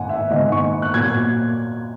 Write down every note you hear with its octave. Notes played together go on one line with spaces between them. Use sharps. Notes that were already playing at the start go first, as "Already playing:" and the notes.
Already playing: G#2 D#3 A#3 F#5 G#5
E5
G#2 D#3 A#3 D#5
C#6
F#6
A#2 F#3 A#3 G#6